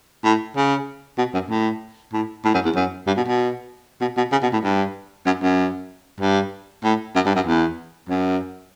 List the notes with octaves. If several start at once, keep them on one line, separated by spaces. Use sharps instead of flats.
A2
C#3
B2
F#2
A2
A2
A2
F#2
E2
F#2
G2
B2
B2
B2
B2
C#3
B2
A2
G2
F#2
F#2
G2
A2
F#2
G2
F#2
E2
F#2